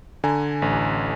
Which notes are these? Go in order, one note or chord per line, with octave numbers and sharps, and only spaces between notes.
D3 G#5 A#5
A1